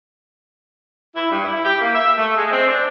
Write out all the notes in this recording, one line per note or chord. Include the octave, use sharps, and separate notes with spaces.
E4
G2
E4
G4
A#3
E5
A3
G#3
C4
D4